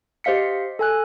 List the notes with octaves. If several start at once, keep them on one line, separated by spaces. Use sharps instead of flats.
G4 C5 D#5 F5 B6 C#7
A4 G#5 F#6